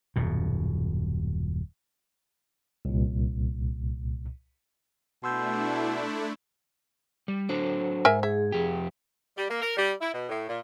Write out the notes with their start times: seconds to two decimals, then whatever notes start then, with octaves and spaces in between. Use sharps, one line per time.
0.16 D#1 F#2 B2
2.85 C2 A#2
5.24 B2 A3 D4 E4 C6 E6 G6
7.28 G3
7.49 F#3 D4 A4 C5
8.05 G#2 A#4 E5 G#5
8.23 G#4 E5
8.52 F2 G4
9.37 G3
9.50 A#3
9.62 A#4
9.77 G3
10.01 E4
10.13 B2
10.29 A2
10.48 A#2